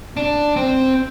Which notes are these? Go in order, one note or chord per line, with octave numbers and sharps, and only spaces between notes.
D4
C4